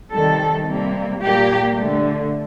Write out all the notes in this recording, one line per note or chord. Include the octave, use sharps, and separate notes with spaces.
C3 D#3 G3 A4
C3 G3 A#3
A#2 G3 A#3 G4
D3 A3